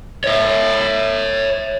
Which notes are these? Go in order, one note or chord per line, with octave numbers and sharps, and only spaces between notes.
C#5 E5